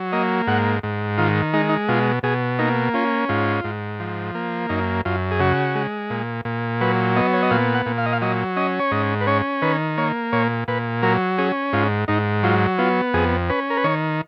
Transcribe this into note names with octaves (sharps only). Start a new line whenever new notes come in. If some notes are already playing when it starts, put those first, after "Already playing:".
Already playing: F#3
A#3 D#5
G#2 F#5
G#2
D#3 F4
G#3 D#4
D#4
B2 F4
B2 G#4
A#3 D#4
C#4 F4
G#2 F4
G#2
F3
A#3
F#2 D#4
F#2 F4
G#4
C#3 F#4
G#3
A#2
A#2
F#3 B4
B3 D#5
C#5
D#5
A#2 F5
F#5
A#2
F5
D#5
F5
F#3 D#5
C#4 D#5
C#5
G#2 D#5
B4
C#4 C#5
D#3 B4
A#3 C#5
A#2 C#5
A#2 B4
F#3 A#4
C#4 G#4
G#2 F4
G#2 D#4
F#3 F4
B3 F4
F2 G#4
C#4 B4
A#4
B4
D#3 C#5